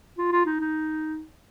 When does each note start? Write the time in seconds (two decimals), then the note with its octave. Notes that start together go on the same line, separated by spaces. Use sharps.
0.18 F4
0.32 F4
0.46 D#4
0.60 D#4